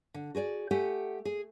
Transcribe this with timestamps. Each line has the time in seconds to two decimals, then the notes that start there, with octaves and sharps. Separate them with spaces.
0.14 D3
0.35 F#4 G#4 C5 D5
0.71 A3 G4 A4 F#5 G#5
1.25 G#4